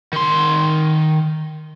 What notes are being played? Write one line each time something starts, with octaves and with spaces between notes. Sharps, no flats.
D#3 C6